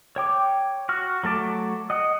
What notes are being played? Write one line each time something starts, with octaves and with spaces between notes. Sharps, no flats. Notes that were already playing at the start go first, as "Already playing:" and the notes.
C#5 G5 D6
F#4 F6 F#6
F#3 A3 A5 D6
D#5 F#5